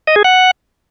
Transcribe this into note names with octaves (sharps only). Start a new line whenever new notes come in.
D#5
G#4
F#5